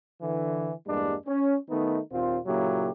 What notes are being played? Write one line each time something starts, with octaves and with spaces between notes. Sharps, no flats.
D3 E3
E2 G2 G3 G#3 A#3 D4
C#4
D#3 A3 B3 D#4
D#2 A#2 C4 F4
A#2 C#3 F#3 A#3 E4 G4